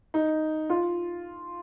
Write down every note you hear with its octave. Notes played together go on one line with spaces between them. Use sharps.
D#4
F4